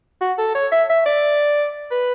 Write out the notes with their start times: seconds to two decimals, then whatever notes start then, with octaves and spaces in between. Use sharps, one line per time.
0.21 F#4
0.38 A4
0.55 C#5
0.72 E5
0.90 E5
1.06 D5
1.91 B4